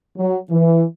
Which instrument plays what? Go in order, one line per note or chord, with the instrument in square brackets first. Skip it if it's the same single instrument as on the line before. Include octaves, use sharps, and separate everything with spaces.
[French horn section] F#3
E3